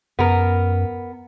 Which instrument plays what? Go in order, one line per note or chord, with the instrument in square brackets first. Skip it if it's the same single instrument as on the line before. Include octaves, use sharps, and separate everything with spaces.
[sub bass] F#2 [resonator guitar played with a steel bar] B3 A#4